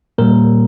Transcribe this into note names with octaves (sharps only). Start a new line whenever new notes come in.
A#2 G3 A#3 A#4